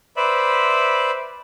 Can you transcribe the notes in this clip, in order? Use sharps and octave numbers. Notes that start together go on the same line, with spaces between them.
B4 C5 D5 E5 B5